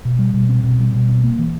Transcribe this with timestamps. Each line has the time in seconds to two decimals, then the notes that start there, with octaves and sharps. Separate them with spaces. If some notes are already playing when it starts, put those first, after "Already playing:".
0.05 B2
0.19 G3
0.34 B2
0.49 C4
0.64 B2
0.80 G3
0.94 B2
1.08 C4
1.23 A#3
1.39 E3